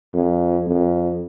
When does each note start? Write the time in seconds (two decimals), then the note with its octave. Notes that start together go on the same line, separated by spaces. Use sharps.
0.14 F2
0.67 F2